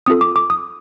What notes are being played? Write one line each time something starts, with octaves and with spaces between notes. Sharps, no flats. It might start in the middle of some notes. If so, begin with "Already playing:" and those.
C4 F4 A4 D#6
D6
D6
D#6